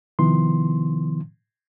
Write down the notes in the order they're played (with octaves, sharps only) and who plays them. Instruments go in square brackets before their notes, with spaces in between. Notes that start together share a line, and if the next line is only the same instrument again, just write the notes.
[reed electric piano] C3 D#3 F3 B3 E4 C6